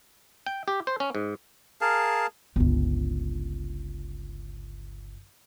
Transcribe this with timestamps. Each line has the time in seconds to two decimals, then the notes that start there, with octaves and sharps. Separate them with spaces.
0.46 G5
0.68 G4
0.87 C5
1.00 C#4
1.15 G#2
1.81 G#4 A#4 F5 A5
2.56 G1 C#2